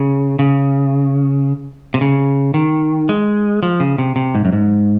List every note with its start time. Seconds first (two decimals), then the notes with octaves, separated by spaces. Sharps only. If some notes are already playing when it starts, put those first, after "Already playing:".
Already playing: C#3
0.39 C#3
1.94 C3
2.01 C#3
2.54 D#3
3.09 G#3
3.63 F3
3.80 C#3
3.98 C3
4.16 C3
4.35 G#2
4.45 F#2
4.53 G#2